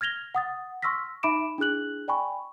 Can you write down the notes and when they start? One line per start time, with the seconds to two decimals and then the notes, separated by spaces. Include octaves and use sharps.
0.01 F6 G#6 A#6 F7 G7
0.35 F#5 D#6 A6
0.82 C6 C#6 E6 F6 A#6 B6
1.23 D#4 E5 B5 D6 D7 E7
1.58 D4 E4 G#4 F#6 F#7
2.08 D5 G5 G#5 B5 C#6